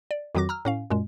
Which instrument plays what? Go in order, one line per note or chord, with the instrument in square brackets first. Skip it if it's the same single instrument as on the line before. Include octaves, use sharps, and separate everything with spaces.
[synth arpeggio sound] D5
F2 D#3 F#3 F#4 D6 A#6
A#5 E6 F6
A2 C#4 F5
F#2 A#2 G#3